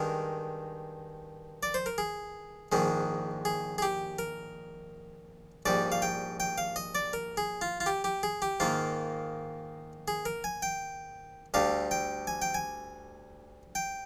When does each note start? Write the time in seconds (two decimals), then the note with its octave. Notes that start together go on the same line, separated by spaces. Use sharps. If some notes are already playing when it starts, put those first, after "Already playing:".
Already playing: G2 D#3 G#3 A#4
1.63 D5
1.74 C5
1.86 A#4
1.98 G#4
2.72 A#1 G#2 D#3 G#3
3.45 G#4
3.78 G#4
3.82 G4
4.19 A#4
5.66 A#1 G#2 G3 D5
5.92 F5
6.02 G5
6.40 G5
6.58 F5
6.76 D#5
6.95 D5
7.13 A#4
7.37 G#4
7.61 F4
7.80 F4
7.86 G4
8.04 G4
8.23 G#4
8.42 G4
8.60 G#2 D#3 A#3 F4
10.08 G#4
10.25 A#4
10.44 G#5
10.62 G5
11.54 D2 D3 G3 F5
11.91 G5
12.27 G#5
12.42 G5
12.54 G#5
13.75 G5